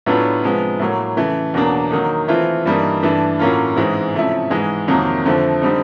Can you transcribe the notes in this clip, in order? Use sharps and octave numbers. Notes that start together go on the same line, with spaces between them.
A2 F#3 B3 D4 F4
C3 F3 G#3 B3
A2 F#3 A#3
C#3 E3 A3
E2 B2 F#3 A#3 D4
D#3 F#3 A#3 D#4
E3 A3 C4 F4
G2 E3 G3 A#3 D#4
G2 E3 A3 D4
A2 F#3 A#3 C#4 F4
G#2 E3 G#3 C4
C3 F3 A3 C#4 E4
G#2 E3 G#3
F2 C3 D#3 F#3 A#3
F2 D3 F3 A3 C4
D3 G3 C4 D#4